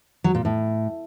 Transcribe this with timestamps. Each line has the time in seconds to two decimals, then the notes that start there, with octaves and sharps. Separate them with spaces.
0.24 F#3
0.35 A#2
0.45 A2